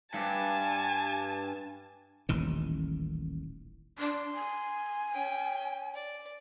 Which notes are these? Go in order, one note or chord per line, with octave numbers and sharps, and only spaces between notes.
G2 G#5 A5
D#1 A1 D#3
D4 C6
G#5
C#4 G5
D5